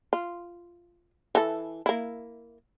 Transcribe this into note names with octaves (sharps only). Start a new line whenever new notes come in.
F4
E3 A4
A#3 E4